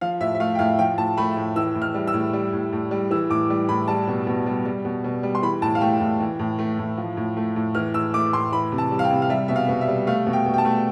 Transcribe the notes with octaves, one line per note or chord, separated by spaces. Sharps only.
F3 F5
A2 E5
E5
A3 F5
G5
A2 F5
F3 G5
A2 A5
A3 B5
A2
E3 E6
A2
F6
G3
E6
A2
G3
A2
A2
G3
E3 E6
A2 D6
G3
A2 B5
G3 A5
B2
B2
G3
G3
B2
B2
G3
C6
E3 B5
A2 A5
F5
A3 G5
A2
E3
A2
A3
A2
F3
A2
A3
A2
E3 F6
A2 E6
A3 D6
A2 C6
E3 B5
C3
A5
G3
F5
G5
C3
F5
G3 E5
B2 E5
F5
B2
E5
G3
A3 F5
B2
G5
B2
G5
A5
A3